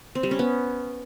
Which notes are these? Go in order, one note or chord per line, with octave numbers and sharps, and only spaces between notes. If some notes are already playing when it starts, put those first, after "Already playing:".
C4
G3
C#4
B3